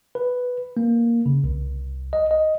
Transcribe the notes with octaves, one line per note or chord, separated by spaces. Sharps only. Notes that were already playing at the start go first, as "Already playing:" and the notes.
B4
A#3
C#3
C2
D#5
D#5